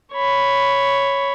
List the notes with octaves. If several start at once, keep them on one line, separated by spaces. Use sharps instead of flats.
C#5 B5